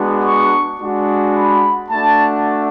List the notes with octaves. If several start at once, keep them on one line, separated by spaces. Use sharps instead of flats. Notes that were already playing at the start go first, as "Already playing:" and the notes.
Already playing: G#3 B3 D4 F#4
C#6
G#3 D4 F#4
B5
A3 D4 F#4 A5